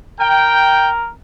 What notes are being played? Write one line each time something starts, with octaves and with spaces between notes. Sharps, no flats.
A#4 G5